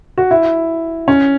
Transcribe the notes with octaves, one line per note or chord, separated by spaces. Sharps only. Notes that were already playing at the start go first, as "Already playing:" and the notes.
F#4
E4
C#4